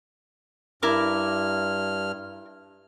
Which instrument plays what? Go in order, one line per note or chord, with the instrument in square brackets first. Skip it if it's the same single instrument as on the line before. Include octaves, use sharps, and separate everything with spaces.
[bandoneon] G2 F6 [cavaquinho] E4 A#4 D6